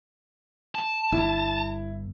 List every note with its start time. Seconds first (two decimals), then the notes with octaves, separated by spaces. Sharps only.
0.75 A5
1.12 G1 E4